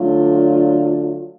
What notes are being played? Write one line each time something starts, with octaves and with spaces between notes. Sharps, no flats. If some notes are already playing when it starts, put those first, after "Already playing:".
Already playing: D3 F#3 A3 D4 F4